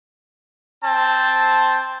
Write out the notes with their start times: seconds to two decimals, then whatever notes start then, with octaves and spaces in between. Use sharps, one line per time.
0.84 C4 A5